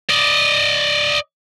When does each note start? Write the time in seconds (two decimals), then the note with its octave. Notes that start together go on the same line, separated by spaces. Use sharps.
0.10 D5 D#5